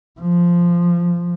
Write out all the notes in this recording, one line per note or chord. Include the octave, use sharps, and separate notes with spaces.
F3